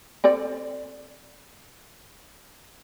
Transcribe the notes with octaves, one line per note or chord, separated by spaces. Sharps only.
C4 A4 D5